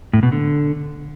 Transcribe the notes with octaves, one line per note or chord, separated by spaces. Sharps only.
A2
B2
D3